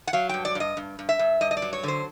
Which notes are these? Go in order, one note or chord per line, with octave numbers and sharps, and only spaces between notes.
F#5
F#3 F5
G2 G5
D5
G2 D#5
G2
G2
E5
G2
G2 D#5
D#5
D5
F#3
C#5
D3 C5